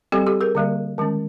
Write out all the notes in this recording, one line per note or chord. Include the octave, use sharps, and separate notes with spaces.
G3 C4 G4 A4
G4 A4
G#4 A#4
D3 G3 A#3
D#3 G#3 C#4